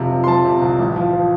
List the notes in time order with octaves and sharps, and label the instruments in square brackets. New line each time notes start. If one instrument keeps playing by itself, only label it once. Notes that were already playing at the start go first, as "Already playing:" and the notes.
Already playing: [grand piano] F1 C3 F3
F3
C6
F3 A5
C3
C2
A1
F3
F3